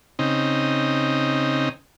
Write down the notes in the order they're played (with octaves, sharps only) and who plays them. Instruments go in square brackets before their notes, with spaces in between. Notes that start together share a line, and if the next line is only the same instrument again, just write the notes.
[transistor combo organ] C#3 C4 D#4